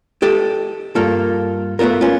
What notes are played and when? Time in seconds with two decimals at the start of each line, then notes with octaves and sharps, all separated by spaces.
0.22 G4 A4 D#5
0.95 G2 A#3 F4 A4
1.79 A3 B3 D4 F4 A#4
2.01 C#4 F4